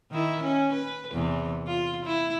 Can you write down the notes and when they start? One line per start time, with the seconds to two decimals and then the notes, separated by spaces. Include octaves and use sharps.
0.11 D#3 E4
0.43 C#4
0.73 B4
1.13 E2 C3
1.67 F4
2.05 E4